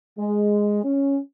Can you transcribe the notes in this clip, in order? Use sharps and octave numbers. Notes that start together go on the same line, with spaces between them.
G#3
C#4